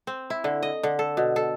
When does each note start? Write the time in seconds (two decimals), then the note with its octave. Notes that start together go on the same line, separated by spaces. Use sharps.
0.07 C4
0.30 E4
0.44 D3
0.63 D#5
0.83 D3
0.99 A4
1.17 B2
1.36 A4